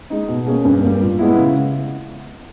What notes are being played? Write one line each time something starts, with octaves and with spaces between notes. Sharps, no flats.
G#3 D#4
B2
A#3 C#4 G#4
G2
G3 A#3
A#2
G#3 B3 E4
C#3